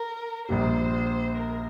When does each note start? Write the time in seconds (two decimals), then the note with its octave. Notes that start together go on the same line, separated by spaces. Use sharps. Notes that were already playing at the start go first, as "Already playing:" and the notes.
Already playing: A#4
0.49 A#1 A#2 G3 C5
1.36 A#4